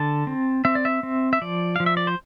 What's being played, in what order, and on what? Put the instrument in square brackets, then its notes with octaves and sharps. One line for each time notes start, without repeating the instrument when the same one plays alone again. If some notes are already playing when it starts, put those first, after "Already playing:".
Already playing: [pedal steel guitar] D3 A5
C4
C4 E5
D5
E5
C4
E5
F3 D5
F3 F5
E5
D5
C5